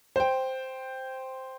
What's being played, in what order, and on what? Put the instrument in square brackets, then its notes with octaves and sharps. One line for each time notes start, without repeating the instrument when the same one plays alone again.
[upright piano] C5 G5